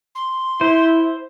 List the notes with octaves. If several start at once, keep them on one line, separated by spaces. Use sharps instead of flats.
C6
E4 C5